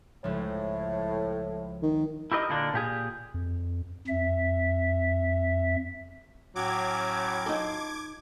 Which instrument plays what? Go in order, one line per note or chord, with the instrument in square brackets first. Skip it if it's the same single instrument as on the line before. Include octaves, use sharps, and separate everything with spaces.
[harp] C#2 F3 [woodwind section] A2
[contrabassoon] D#3
[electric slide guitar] E4 G4 A#4 D#5
A#2 D3 A#3 D4
A#2 G4 G#4
[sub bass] F2
[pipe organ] F2 E5
[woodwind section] A2 C#4 [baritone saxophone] F#3 [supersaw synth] D6 G#6
[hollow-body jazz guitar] D#4 F4 A4